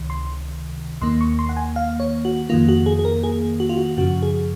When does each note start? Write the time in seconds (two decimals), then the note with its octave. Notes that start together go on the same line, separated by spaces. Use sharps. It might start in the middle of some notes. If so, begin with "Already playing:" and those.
Already playing: C#2 C3 D#3
0.10 C6
1.01 D#2 D#3 A#3 C6
1.21 C#6
1.39 C6
1.49 F#5
1.57 G#5
1.76 F5
2.00 C#5
2.25 F#4
2.49 F2 D#3 A#3 F4
2.68 F#4
2.86 G#4
2.99 G#4
3.05 A#4
3.23 G#4
3.60 F#4
3.69 F4
3.77 F#4
3.97 F#2 C#3 F3 F#4
4.22 G#4